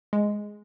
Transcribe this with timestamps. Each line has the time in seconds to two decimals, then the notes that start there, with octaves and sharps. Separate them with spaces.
0.13 G#3